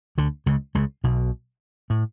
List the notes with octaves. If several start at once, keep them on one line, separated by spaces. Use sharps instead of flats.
D2 D3
C#2 C#3
C#2 C#3
B1 B2
A2